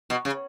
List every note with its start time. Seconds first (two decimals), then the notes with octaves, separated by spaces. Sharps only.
0.10 B2
0.25 C#3